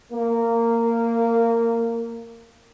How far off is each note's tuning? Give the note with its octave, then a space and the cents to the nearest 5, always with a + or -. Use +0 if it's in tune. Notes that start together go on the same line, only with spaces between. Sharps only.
A#3 -15